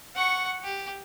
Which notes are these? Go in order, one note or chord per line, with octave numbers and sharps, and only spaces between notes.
F#5 C#6
G4